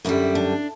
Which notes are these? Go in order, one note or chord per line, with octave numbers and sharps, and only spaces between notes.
F#2 D3 G3 E4
D4